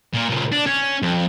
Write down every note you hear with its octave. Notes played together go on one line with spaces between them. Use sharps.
A#2 A#4
C#2 A#2
D4
C#4
F2